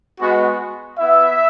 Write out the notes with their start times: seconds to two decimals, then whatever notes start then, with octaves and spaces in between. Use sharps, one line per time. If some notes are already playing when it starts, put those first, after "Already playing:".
0.19 G#3 B3 F#4
0.98 B3 E4 E5